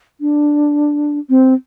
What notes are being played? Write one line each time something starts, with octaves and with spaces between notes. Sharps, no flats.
D4
C4